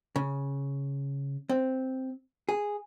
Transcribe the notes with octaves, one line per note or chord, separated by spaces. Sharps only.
C#3
C4
G#4